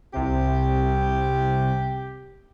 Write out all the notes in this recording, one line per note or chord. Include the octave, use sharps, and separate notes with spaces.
C2 C3 G4